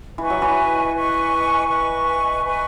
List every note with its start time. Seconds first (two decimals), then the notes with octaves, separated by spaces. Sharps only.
0.18 E3 B4 D#5 G#5 C#6
0.30 F#3
0.42 E3
0.93 B4 D#5 G#5 C#6
1.68 B4 D#5 G#5 C#6
2.44 B4 D#5 G#5 C#6